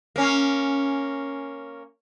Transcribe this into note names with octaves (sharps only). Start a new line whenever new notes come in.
A#3 C#4